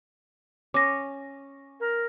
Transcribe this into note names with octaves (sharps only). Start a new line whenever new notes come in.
C#4 D6 A#6
A#4